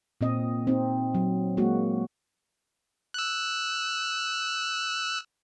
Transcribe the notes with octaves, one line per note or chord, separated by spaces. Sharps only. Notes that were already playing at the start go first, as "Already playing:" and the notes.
A#2 C4 D#5
C4 D#4
F#3
G#3 A#3 F#4
E6 F#6